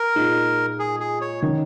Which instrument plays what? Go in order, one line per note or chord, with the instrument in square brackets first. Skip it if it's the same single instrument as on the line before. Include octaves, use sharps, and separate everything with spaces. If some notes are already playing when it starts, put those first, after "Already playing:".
Already playing: [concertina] A#4
[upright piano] A#2 G#3 D#4
[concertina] G#4
G#4
C#5
[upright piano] D#3 C#4